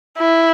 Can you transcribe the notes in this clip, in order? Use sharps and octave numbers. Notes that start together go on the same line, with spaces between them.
E4